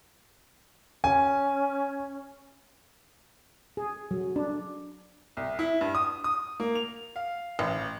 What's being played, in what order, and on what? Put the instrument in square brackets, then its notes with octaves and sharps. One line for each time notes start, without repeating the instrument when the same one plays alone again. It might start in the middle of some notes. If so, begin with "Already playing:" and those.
[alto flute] C#4 [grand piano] G#5
[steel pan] G#4
F#3
D4
[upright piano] C2
E4
G2
D#6
D#6
A#3
F7
F5
A1